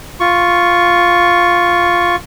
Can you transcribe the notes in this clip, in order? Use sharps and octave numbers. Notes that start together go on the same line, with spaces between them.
F4 C#6